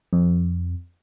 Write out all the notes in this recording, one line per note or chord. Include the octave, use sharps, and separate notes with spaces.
F2